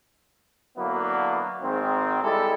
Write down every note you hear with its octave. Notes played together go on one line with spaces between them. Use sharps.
D3 F#3 A#3 B3 D4 E4
G#1 G#2 D#3 C4
G3 G#3 E4 G4 A4